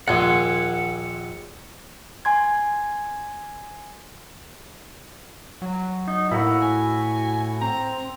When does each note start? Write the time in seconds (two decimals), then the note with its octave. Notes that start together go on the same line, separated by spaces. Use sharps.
0.08 A#1 D#2 F#5 G#5 C6
2.25 G#5 C6 G#6
5.62 F#3
6.08 D#4
6.32 A2 A#3 E4 F#4
6.62 G#5
7.61 C4 A#5